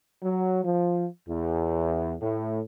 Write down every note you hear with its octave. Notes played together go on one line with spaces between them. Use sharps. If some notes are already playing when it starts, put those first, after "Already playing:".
F#3
F3
E2
A2